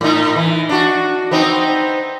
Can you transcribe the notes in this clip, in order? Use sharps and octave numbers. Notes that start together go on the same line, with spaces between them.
A2 D#4
E3
D4 F#4
B3 C4 D#4